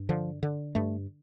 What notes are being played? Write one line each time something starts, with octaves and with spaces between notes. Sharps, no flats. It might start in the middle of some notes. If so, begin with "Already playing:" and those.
Already playing: G2
D3 F3
D3
G2 A3